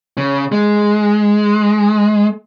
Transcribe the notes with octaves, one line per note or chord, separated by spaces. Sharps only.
C#3
G#3